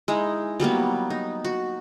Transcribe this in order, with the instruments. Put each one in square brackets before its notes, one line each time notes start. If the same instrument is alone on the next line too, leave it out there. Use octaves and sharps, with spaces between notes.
[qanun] G#3 D#4 E4
F#3 G3 A#3 B3
D#4
F#4